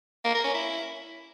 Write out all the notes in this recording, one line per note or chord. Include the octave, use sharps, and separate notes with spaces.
A#3
A#4
C#4
E4